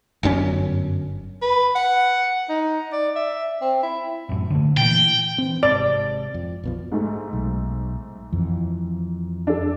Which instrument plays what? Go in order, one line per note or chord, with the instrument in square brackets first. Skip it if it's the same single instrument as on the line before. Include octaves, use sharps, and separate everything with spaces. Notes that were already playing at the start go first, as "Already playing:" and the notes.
[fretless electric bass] G1 F#2 C4 C#4
[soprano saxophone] B4
F#5
D#4
D5
E5
C4
E4
[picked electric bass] A1 F#2 A2
D3 G3 A3
[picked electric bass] A#2 E3 [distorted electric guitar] G5
[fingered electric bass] E3 C4
[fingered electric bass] G#1 G#2 C3 [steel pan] D5
[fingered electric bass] F2
B1 B2 F3
[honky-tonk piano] G#2 A3
[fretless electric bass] B1
F2 E3
[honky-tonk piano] D4 A4